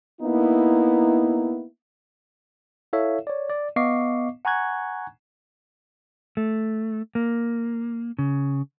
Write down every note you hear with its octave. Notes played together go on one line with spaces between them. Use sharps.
A#3 B3 D#4 E4
E4 A4 C#5 E5 F5
C#5 D5
D5
B3 D#5 F5 C#6 D6 C7
F#5 G#5 A#5 C#6 F#6 G#6
A3
A#3
C#3